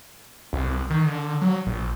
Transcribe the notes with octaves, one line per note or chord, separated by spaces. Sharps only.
C2
D#3
D3
F#3
A#1